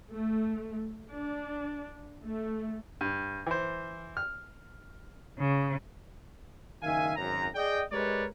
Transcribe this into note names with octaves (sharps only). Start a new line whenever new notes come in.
A3
D4
A3
G2
E3 C5
F6
C#3
F#1 D#3 E5 F5 G#5
G#1 F#2 A#5
G#4 D5 D#5 G5
G#3 G4 A#4 B4 C#5 D5